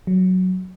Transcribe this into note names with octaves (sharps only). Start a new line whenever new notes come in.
F#3